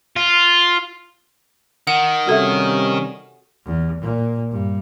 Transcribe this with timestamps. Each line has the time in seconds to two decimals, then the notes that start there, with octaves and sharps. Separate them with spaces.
0.16 F4
1.87 D#3 F#5
2.27 C3 G3 C#4 F#4 A4 E5
3.65 E2
4.01 A#2
4.51 G2